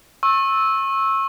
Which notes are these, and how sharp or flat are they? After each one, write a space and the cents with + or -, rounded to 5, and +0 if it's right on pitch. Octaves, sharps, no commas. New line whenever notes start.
C#6 -30 E6 -10